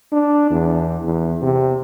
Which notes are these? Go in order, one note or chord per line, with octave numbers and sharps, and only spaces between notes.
D4
E2
E2
C3